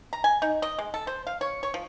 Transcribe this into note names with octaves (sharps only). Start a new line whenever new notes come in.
A#5
G#5
D#4
D#5
G#3
A4
C5
F5
C#5
C#5
F3